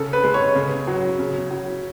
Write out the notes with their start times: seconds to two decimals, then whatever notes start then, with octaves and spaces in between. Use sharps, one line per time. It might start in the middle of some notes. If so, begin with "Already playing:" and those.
Already playing: C#3 A4
0.13 B4
0.24 G#3
0.34 C#5
0.55 C#3
0.87 F#3
1.19 C#3
1.51 F#3